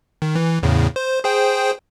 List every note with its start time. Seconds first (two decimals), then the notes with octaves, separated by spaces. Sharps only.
0.22 D#3
0.35 E3
0.63 E2 A2 C#3
0.96 C5
1.24 G#4 C5 G5